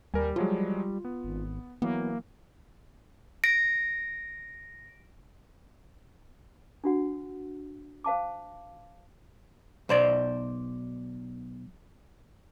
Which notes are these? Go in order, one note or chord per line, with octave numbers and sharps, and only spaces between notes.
D#2 G3 A#4 G#5
F3 F#3 G#3 F4
B3
G#1
E3 F#3 A#3 B3
A#6 D7
D4 F#4 F#5
C5 F5 A5 D6
B1 C5 D5